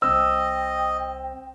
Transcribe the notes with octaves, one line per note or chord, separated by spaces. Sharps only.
C2 C4 C5 D#5 G5 E6